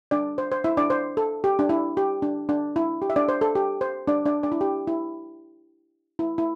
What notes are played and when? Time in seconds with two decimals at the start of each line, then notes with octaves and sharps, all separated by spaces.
0.11 D4 D5
0.38 C5
0.52 C5
0.64 E4 E5
0.77 D4 D5
0.90 C5
1.17 A4
1.44 G4
1.59 D4
1.69 E4
1.97 G4
2.22 D4
2.49 D4
2.76 E4
3.02 G4
3.10 E5
3.16 D4 D5
3.29 C5
3.41 A4
3.55 G4
3.81 C5
4.08 D4 D5
4.26 D4 D5
4.43 D4 D5
4.52 E4
4.61 G4
4.87 E4
6.19 E4
6.38 E4